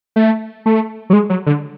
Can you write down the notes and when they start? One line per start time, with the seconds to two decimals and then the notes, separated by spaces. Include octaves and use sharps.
0.16 A3
0.66 A3
1.10 F#3
1.13 G#3
1.30 F#3
1.46 D3